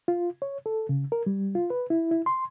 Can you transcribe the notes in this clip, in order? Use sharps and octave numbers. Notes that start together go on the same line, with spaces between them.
F4
C#5
A4
C#3
A#4
G3
F4
B4
E4
E4
C6